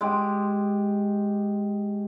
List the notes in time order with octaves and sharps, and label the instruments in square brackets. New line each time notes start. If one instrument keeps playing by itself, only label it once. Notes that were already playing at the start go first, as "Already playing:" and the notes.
[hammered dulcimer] G#3 G4